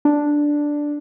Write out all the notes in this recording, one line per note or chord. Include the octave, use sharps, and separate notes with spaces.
D4